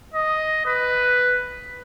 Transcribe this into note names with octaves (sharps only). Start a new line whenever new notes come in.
D#5
B4